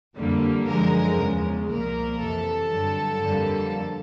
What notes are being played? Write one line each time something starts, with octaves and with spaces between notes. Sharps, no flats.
F2 D3 G3 A#3
F#2 D3 F3 G#3 A#4
E2 C#3 F3 G#3
C2 A#2 F3 A#3 A#4
F2 C3 E3 A4
G2 D3 F#3
F2 D3 G3 A#3